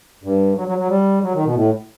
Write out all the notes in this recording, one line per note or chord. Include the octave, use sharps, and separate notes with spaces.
G2
F#3
F#3
F#3
G3
F#3
D#3
B2
A2